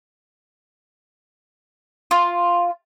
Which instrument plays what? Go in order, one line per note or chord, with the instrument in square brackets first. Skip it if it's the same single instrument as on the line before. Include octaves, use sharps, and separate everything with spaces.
[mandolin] F4